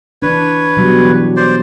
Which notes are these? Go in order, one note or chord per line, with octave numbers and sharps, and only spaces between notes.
E3 D4 B4 C#5
B2 F#3 G3
E3
C5 D5